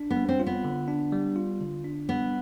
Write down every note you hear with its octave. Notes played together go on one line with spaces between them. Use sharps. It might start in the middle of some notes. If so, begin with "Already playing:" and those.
Already playing: D4
B3
G3
C4
F4
B3
D3
D4
G3
F4
D3
D4
G3 B3